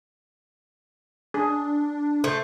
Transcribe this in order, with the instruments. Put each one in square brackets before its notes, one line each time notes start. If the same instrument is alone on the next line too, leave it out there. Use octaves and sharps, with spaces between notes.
[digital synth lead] D4 [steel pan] G#4
[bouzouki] A3 [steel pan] C5 [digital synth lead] C#6